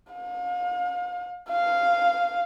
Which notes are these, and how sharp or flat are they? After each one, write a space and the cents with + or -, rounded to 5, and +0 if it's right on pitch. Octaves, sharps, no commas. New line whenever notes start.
F5 +40
F5 -5